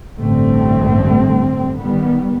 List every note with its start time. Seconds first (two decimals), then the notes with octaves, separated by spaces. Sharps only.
0.18 A1 G2 D3 G3 A3 C4
1.79 D#3 G3 B3